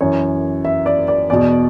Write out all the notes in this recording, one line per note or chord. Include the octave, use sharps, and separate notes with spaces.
F#2 E3 C#5
E5
D5
D5
E2 B2 D5